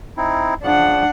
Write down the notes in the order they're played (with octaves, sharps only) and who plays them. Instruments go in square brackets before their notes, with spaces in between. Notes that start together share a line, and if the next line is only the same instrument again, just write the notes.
[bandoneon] C4 D#4 E4
[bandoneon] C#3 F3 [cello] D4 F#5